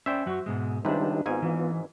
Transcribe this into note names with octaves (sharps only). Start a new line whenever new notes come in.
C#4 C5 D5 E5 G5
F#2 F#3 F#4
G#2 B2 G#3
C#2 C3 D#3 G3 D4 D#4 B4
G#1 G#2 B3 F4 G#5
E3